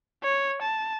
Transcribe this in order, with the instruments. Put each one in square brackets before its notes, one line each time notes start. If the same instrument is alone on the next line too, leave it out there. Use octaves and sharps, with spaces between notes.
[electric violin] C#5
A5